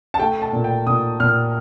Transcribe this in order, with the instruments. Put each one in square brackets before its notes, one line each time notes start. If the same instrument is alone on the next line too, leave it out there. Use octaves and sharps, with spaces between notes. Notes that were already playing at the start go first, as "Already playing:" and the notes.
[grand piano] A5
A3 G5
A5
A#2
G5
A#2 D#6
A#2 F6